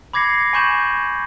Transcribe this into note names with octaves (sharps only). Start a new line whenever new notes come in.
B5 D6 G#6 A#6 C7 C#7
G#5 B5 C#6 G6 E7 F#7